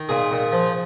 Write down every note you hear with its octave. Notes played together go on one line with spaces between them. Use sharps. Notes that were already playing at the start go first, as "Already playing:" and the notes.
Already playing: D#3
A#2 G#4
A#2
F3